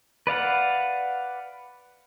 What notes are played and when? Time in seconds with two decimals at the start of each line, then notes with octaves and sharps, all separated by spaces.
0.27 B4 D5 F5 F#5